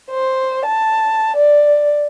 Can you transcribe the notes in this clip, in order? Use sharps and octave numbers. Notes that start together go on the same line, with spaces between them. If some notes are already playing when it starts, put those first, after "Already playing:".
C5
A5
D5